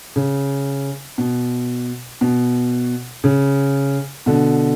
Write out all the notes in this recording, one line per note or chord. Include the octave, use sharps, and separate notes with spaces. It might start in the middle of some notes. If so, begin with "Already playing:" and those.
C#3
B2
B2
C#3
B2 D3